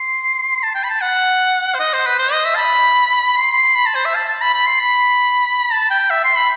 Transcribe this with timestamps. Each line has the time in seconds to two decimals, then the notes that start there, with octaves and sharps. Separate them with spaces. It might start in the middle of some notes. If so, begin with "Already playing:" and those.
Already playing: C6
0.63 A5
0.75 G5
0.84 B5
0.89 A5
1.01 F#5
1.75 C5
1.79 D#5
1.93 C5
2.06 B4
2.19 C5
2.32 D#5
2.45 E5
2.55 A5
2.58 B5
3.37 C6
3.75 B5
3.86 A5
3.95 C5
4.05 E5
4.15 A5
4.29 A5
4.41 B5
4.54 B5
4.67 C6
4.80 B5
5.72 A5
5.91 G5
6.10 E5
6.24 C6
6.37 B5